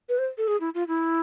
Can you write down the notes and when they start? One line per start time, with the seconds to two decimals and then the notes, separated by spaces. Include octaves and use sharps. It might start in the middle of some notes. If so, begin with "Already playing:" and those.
0.09 B4
0.18 C5
0.38 A4
0.48 G#4
0.60 E4
0.74 F4
0.88 E4